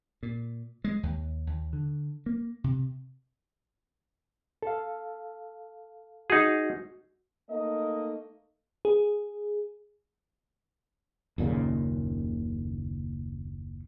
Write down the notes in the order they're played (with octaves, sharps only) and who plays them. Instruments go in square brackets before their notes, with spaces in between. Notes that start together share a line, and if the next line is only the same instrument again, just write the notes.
[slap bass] A#2
G#3
D#2
D#2
D3
A#3
C3
[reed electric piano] A4 F5
[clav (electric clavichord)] D#4 G#4 [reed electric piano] F#4
[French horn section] A3 A#3 D#4 D#5
[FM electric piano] G#4
[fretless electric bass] F#1 D#2 A#2 C#3